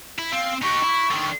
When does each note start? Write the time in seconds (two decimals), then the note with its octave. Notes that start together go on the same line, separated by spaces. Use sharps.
0.19 E4
0.33 C4 F5
0.63 D#4 G4 C#6
0.84 E4
1.11 D3 D#3